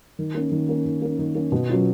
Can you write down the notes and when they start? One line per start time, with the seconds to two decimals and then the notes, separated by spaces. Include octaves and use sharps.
0.19 D#3
0.34 A#3 C#4
0.52 D#3
0.69 A#3 C#4
0.85 D#3
1.02 A#3 C#4
1.19 D#3
1.35 A#3 C#4
1.52 B2
1.69 F#3 C#4 F4